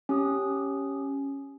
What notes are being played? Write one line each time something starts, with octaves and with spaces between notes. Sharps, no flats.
C#4 G4 D#6